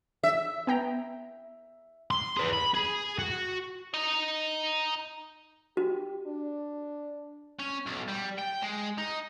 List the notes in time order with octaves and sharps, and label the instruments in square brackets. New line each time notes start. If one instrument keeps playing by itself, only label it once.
[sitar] E5
[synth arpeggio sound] B3 G5 A#5
[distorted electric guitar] C6
G#4 B4
B5
G#4
F#4
[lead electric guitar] D#4 D#5
[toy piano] F#4 [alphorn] G4
[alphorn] D4
[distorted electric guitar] C#4
B1
G3
G5
G#3
D#4